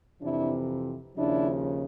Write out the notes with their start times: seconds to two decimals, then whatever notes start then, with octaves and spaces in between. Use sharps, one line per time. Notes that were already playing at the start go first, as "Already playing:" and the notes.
0.21 F2 C3 E3 D4 E4
1.16 D#2 C#3 F3 D4 E4